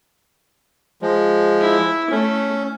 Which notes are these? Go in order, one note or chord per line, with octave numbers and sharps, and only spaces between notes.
F3 G#3
E4
A3 C#4